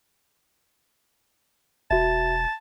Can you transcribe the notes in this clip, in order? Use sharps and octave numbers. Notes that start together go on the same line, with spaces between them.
E1 F#4 E5 A5